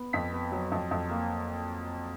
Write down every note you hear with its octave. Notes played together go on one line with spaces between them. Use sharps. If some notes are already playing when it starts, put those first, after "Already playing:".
Already playing: B3
F2 B6
B3
F#3
F2
F2
A#3